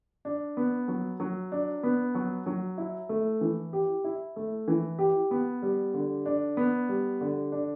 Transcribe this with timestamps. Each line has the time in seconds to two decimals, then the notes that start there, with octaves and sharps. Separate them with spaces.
0.25 D4
0.57 B3
0.88 F#3
1.20 F#3
1.52 D4
1.83 B3
2.15 F#3
2.46 F#3
2.78 E4
3.09 A3
3.41 E3
3.73 G4
4.04 E4
4.36 A3
4.68 E3
4.99 G4
5.31 B3
5.62 G3
5.94 D3
6.26 D4
6.57 B3
6.89 G3
7.21 D3
7.52 D4